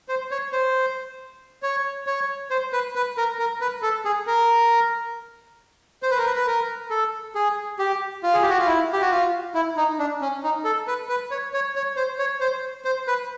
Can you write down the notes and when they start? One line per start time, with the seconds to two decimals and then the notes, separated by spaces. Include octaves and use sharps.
0.09 C5
0.31 C#5
0.53 C5
1.63 C#5
2.07 C#5
2.51 C5
2.73 B4
2.95 B4
3.17 A#4
3.39 A#4
3.61 B4
3.82 A4
4.05 G#4
4.27 A#4
6.03 C5
6.11 B4
6.18 A#4
6.26 B4
6.36 B4
6.47 A#4
6.90 A4
7.35 G#4
7.79 G4
8.23 F4
8.34 G#4
8.42 G4
8.49 F#4
8.59 F4
8.66 E4
8.93 G4
9.02 F#4
9.11 F4
9.55 E4
9.77 D#4
9.99 D4
10.21 C#4
10.43 D#4
10.65 A4
10.87 B4
11.09 B4
11.31 C#5
11.54 C#5
11.76 C#5
11.96 C5
12.19 C#5
12.41 C5
12.85 C5
13.08 B4